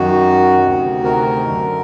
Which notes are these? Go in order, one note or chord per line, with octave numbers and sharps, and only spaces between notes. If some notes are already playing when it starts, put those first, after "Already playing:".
Already playing: F#2 D#3 F#4
D2 C3 D#3
A#4
F#2 D3